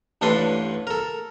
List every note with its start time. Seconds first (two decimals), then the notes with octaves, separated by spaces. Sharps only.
0.21 A1 G2 D4 A4 B4 C6
0.87 A4 A#4